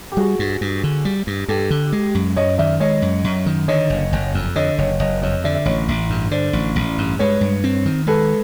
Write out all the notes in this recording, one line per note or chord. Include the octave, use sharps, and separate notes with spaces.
G4
G3 F#4 G#4
G2
G2
D3
G3
G2
G2 G4 A4
D3
G#3
F#2
F#2 C#5 D#5
D#3 D5 E5
G#3 C#5 D#5
F#2
F#2
D#3
D3 C#5 D#5
F#1
F#1
F2
D3 C#5 D#5
F#1 C#5 D#5
F#1 C#5 D#5
F2 C#5 D#5
D3 D5 E5
D5 E5
A1 C#5 D#5
A1
G2
D3 C5 D5
A1
A1
G2
G#3 B4 C#5
G2
C4
D#3
G#3 A4 B4